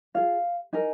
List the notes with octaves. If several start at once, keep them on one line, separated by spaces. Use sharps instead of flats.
F4 G#4 F5
D#4 A#4 G#5